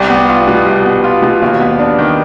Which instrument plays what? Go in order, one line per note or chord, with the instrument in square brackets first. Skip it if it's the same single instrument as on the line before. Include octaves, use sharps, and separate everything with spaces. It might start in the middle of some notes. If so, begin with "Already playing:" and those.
Already playing: [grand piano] C2 [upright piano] G3 G4
[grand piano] B3
F4
B2
C2
B3
F4
B2
D#2
B3
D4
D#3